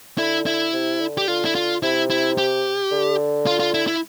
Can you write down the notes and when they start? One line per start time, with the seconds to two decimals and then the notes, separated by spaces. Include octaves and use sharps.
0.18 D3 E4
0.46 E4
0.73 C3
1.00 D3
1.17 G4
1.28 D3 F4
1.45 E4
1.55 F4
1.83 C3 E4
2.10 E4
2.38 G4
2.91 D3
3.47 F4
3.60 F4
3.74 E4
3.87 E4